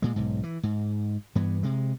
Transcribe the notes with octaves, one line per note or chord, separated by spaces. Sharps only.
A#2 G#3
B1 G#2
E3
G#2
G2 E3 B3
C3 G#3